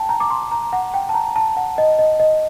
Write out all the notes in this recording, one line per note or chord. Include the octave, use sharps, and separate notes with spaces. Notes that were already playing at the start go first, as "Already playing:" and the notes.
Already playing: G5 A5
A#5
D6
C6
A#5
F#5
G5
A5
A#5
A5
F#5
D#5
D#5
D#5